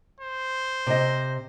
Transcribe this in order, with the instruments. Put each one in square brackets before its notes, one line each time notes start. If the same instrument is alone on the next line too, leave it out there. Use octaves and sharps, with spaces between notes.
[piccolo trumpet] C5
[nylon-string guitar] C3 D#5